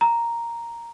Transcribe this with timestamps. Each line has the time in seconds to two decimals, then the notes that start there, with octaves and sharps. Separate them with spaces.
0.01 A#5